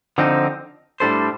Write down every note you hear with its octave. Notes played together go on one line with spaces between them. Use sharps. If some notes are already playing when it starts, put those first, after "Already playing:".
D3 F3 C4 D#4
A2 G3 D4 A4 C5